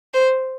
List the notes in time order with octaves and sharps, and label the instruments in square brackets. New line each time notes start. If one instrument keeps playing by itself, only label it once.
[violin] C5